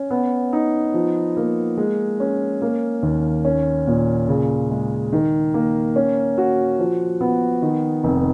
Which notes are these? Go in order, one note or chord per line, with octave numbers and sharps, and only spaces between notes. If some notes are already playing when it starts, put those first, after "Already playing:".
Already playing: C#4
B3
D#4
F3
A#3
G#3
C#4
A#3
D#2
C#4
A#2
C#3
G#3
D#3
A#3
C#4
F#4
F3
B3
D#3
F1